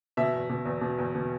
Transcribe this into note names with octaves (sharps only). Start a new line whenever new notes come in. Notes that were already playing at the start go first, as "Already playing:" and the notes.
B2 E5
E2
B2
E2
B2
E2
B2